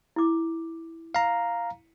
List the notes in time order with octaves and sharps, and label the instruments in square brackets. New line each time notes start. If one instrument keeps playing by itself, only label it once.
[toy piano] E4 D6
[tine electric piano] F5 A#5